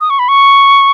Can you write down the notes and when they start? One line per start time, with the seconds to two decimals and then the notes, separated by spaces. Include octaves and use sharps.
0.01 D#6
0.10 C#6
0.19 B5
0.28 C#6